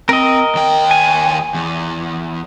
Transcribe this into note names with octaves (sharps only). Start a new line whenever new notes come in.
C4 A#4 D#5
D#2 G5
G#5
E2